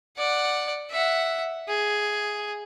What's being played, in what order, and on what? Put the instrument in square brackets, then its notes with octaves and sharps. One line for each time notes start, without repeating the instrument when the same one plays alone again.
[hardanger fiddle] D5 F#5
E5 F#5
G#4